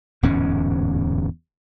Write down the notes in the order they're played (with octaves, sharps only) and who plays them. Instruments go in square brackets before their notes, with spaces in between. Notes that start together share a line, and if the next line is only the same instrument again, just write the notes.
[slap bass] D1 E2 G#2 C#4